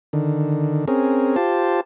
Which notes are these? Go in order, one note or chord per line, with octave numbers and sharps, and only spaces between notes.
D3 D#3
C4 C#4 G#4 A#4
F4 G4 C5 A5